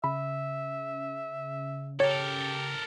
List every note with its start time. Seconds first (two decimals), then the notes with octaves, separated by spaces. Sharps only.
0.04 C#3 E5 B5
2.00 G4 A4 A#4 C#5